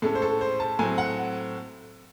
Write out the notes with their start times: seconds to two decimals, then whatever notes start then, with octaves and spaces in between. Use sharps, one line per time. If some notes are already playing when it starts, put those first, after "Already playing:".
0.02 A2 G#3 C#4 A4
0.15 C5
0.22 A4
0.41 C5
0.60 A5
0.79 A2 F#3 C4 G#5
0.98 F#5